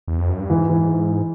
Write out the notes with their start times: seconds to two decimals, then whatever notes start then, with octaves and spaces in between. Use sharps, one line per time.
0.08 E2
0.18 F2
0.29 F#2
0.40 G2
0.50 G#2 E3
0.69 E3